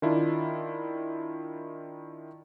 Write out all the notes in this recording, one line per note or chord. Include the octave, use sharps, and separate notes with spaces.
D#3 D4 E4 F4